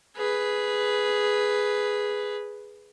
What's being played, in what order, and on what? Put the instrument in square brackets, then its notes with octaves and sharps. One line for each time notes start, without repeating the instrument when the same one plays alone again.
[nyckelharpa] G#4 B4